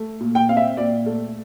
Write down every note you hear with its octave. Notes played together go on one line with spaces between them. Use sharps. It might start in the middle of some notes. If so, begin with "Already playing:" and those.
Already playing: A3
A#2
G5
C4 F5
E5
A#2 D5
A3